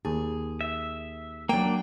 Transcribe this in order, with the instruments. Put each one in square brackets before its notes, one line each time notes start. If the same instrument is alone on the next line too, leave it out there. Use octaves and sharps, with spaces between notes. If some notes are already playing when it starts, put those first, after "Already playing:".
[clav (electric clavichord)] D#2 A5 [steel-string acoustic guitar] G#4
[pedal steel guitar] E5
[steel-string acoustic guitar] F#3 G5 [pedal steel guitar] A#3 D4